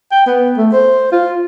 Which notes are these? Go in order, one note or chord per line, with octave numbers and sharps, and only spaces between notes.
G5
B3
A3
C5
F4